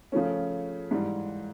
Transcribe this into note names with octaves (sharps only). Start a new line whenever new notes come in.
C#3 F3 A3 C#4
G#2 E3 G3